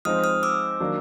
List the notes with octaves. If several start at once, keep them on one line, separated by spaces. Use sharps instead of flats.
F3 G#3 C4 D#4 D#6 F6
D#6 F6
D6 E6
D#3 F#3 A#3 D4